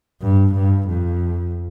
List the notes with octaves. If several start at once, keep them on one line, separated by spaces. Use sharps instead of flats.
G2
G2
F2